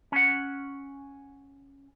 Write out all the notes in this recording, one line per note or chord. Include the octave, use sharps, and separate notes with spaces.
C#4 F#5